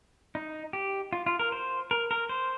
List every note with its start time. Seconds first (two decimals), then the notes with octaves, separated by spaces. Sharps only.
0.35 D#4
0.73 G4
1.13 F4
1.26 F4
1.39 A#4
1.52 C5
1.91 A#4
2.11 A#4
2.29 C5